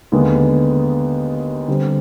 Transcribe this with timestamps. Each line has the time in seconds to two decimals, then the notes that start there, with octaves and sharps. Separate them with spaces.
0.12 D#2 D3 G#3 B3
1.68 D3 G3 C4